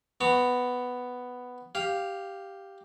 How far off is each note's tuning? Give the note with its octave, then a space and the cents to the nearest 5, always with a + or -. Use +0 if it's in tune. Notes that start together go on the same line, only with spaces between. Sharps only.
B3 +5 A#5 -35 C#6 +10
G4 +0 F5 +0